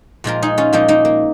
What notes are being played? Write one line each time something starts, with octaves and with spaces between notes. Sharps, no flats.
A#2 F3 G#3 F4 A#4
D#4 G#4
C#4 F4
A#2 F3 G#3 A#3 D#4
A#3 D#4
A#3